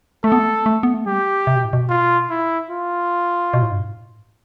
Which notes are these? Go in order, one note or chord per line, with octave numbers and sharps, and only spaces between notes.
A3 A4
B3
A3
A3
B3
A3
G3 G4
C3
B2
A2
B2
F4
E4
F4
B2
A2
G2
A2